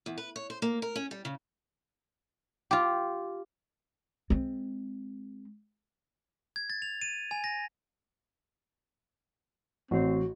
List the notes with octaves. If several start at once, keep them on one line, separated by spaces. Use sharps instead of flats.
E2
B4
C#5
C5
A#3
A#4
C#4
G3
C#3
F4 G4
G#3 C4
G#6
A6
F7
D#7
G#5
A#6
A1 C4 F#4